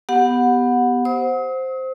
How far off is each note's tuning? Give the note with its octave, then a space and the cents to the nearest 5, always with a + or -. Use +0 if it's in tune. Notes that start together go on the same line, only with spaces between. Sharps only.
B3 +0 G4 +0 F#5 -20
C5 +0 D#6 +45